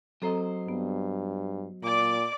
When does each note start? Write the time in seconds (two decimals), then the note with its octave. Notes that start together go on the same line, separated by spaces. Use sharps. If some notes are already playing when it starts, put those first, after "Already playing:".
0.22 F#3 C4 A4 C5 D#5 A#5
0.69 G2 B3
1.83 A#2 D5 D6